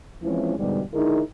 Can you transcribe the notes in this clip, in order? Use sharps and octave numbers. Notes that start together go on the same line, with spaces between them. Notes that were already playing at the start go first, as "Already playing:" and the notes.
E3 F3 G#3 C4 C#4 E4
E2 G#2 B2 D3 G3
D3 G#3 D#4 E4 G#4 A#4